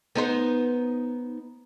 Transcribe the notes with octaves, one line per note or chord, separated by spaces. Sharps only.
B3 D#4 C5